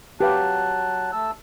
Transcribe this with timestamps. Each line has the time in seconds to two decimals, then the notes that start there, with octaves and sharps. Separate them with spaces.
0.21 F#3 G4 B4 F5 A5 F#6
1.12 A3 A5 E6